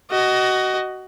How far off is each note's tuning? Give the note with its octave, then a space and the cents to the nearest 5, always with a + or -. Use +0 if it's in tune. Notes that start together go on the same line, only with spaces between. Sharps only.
F#4 +20 D#5 +0